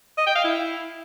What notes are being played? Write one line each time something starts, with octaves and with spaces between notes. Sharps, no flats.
D#5
G5
F5
E4